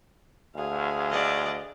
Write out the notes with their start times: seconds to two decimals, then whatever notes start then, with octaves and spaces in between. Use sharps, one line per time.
0.55 D2 G#4 F5
1.10 D5 D#5